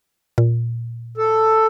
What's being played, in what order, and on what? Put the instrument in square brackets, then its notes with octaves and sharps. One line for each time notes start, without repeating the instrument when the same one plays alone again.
[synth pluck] A#2
[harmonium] A4